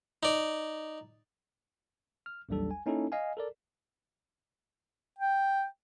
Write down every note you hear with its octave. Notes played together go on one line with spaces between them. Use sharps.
D#4 D5
F6
A1 D#2 F#3 G3 D4 A4
G#5
A#3 C#4 D#4 E4 A4
D#5 F5 G#5
A4 A#4 D5
G5